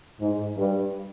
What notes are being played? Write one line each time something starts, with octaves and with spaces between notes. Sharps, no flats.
G#2
G2